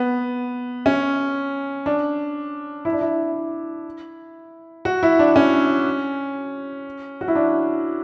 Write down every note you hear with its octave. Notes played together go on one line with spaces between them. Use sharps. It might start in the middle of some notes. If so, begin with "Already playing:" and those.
Already playing: B3
C#4
D4
E4
D4
E4
F#4
E4
D4
C#4
F#4
E4
D4